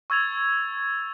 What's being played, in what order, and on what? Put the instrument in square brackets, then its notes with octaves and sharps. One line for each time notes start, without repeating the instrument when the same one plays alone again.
[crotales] C#6 E6 G#6 A6 F7